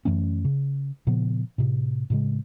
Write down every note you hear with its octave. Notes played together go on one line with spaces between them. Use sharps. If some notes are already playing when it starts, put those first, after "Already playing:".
F#2 E3 A3 C#4
C#3
A#2 C#3 F3 B3
A2 C3
A2 C#3 G#3